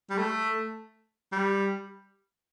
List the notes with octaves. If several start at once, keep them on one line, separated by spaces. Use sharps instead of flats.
G3
A3
G3